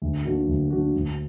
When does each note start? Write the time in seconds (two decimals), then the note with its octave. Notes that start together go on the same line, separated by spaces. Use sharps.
0.02 D2
0.25 D3 A#3 D4 F#4
0.47 D2
0.70 D3 A#3 D4 F#4
0.94 D2